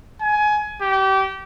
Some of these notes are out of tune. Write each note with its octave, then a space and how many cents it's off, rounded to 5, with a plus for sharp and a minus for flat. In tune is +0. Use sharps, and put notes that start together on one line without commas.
G#5 +20
G4 -25